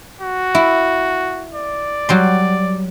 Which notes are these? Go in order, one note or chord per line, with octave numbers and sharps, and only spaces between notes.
F#4
E4
D5
F#3 G3 C6